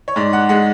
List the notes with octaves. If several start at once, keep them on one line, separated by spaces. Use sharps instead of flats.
C#5
G#2 D5
F#5
G#3 F#5